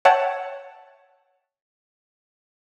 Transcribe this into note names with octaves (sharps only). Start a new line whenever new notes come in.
C#5 E5 F#5 G5 A5